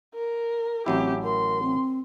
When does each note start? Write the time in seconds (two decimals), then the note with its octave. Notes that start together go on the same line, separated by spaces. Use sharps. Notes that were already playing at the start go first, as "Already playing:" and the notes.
0.14 A#4
0.86 A1 F#3 C4 E4 G4
1.23 A#4 C6
1.62 C4